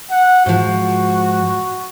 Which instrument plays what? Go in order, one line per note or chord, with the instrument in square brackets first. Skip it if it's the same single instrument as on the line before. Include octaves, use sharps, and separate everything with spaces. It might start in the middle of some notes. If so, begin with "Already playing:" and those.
[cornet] F#5
[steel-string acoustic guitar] G#2 F3 [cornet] F#4